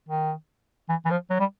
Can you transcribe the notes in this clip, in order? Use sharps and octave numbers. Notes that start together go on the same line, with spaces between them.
D#3
E3
E3
F3
F#3
G3